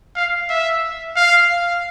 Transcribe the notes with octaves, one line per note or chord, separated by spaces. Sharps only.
F5
E5
F5